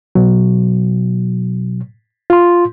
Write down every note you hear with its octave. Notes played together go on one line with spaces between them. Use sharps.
B2 F#3
F4 C6